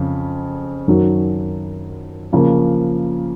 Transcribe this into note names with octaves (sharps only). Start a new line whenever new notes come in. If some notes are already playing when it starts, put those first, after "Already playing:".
Already playing: F2 C#3
F#2 D#3 F#3
C#3 F3 A#3